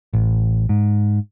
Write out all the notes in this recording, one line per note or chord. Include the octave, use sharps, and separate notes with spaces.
A1
G#2